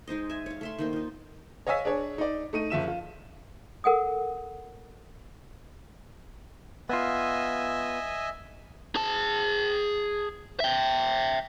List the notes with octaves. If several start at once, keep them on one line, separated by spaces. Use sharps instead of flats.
G#3 D#4 C5 D#5
E5 G#5
C#5 F5
A3 E5 C6
D#3 A#3 C5
D#4 F4
C#5 D#5 F5 G#5 E6 B6
D4 G#4 C#5
D#4 D5
A3 D#4 D#7
F#1 F3 E5 E7
F4
A4 A#4 F#5 G#5 D#6
B3 F4 D#5 E5 G#5
G#4 A5
E5 G5